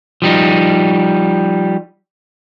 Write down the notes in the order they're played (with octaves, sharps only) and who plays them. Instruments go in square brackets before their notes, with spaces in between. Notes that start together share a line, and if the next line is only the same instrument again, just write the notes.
[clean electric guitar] F3 G3 D#4